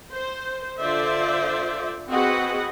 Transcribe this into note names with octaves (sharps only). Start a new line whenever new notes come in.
C5
D3 F4 C5 D5 E5
C4 F#4 G#4 B4 D#5 F#5